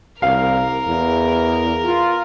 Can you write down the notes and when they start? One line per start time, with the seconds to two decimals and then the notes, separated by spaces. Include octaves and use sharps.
0.22 C2 A#4 F5
0.88 E2
1.85 F4